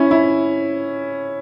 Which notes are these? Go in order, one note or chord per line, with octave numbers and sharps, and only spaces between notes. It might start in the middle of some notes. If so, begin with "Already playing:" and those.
Already playing: C#4 E4
E4